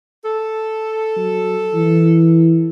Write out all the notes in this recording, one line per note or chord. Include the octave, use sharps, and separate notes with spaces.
A4
F#3
E3